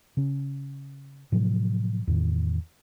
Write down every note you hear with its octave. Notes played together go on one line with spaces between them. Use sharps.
C#3 C#4
A2 C3 F3 F#3
E2 A2 D#3